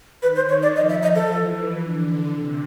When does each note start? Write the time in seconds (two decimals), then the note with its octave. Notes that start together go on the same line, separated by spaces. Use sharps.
0.22 D#3 B4
0.36 C5
0.49 C#5
0.62 D5
0.76 F3 D#5
0.89 E5
1.03 D#5
1.15 A4
1.28 E3
1.81 D3
2.35 C3